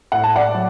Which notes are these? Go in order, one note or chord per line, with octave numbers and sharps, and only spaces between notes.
A2 F#5
A5
D5 F#5
F#3